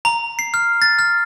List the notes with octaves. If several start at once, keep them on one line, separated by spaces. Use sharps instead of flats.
A#5
C7
F6
A6
F6